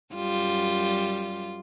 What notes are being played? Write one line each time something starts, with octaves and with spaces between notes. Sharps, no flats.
F#2 G3 F4